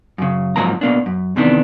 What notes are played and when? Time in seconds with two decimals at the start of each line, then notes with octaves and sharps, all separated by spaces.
0.18 F#2 C#3
0.56 G#2 F3 F#3 A#3 A#5
0.81 B2 A#3 D4
1.06 F#2
1.36 F2 C3 D#3 E3 B3 D4